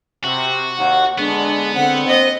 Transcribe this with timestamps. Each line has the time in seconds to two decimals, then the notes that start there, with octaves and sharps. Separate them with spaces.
0.24 C3 F#4
0.78 D#2 F#5
1.18 D3 G#3 B3 D4
1.75 D3 C4 F#5
2.08 C5 D#5